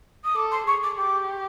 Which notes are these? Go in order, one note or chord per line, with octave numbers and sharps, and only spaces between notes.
D#6
A4 D6
C6
G#4 C#6
D6
G4 D6